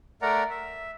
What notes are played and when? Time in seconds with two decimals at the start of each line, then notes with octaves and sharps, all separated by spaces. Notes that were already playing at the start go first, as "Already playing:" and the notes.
0.22 A3 A#4 D5 F#5 A#5
0.50 E5